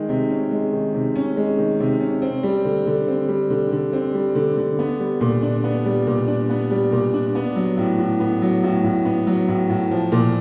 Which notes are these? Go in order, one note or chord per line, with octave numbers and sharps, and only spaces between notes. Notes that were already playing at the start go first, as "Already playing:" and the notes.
Already playing: D#3 G#3
C3
C#4
G#3
D#3
C3
C#4
G#3
D#3
C3
C#4
C4
G3
D3
D3
C4
G3
D3
D3
C4
G3
D3
D3
B3
G3
A#2
D4
B3
G3
A#2
D4
B3
G3
A#2
D4
B3
F#3
A2
A2
B3
F#3
A2
A2
B3
F#3
A2
A2
F3
A#2